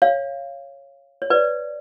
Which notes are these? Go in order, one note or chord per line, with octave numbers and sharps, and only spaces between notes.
C#5 F5
C#5
B4 D5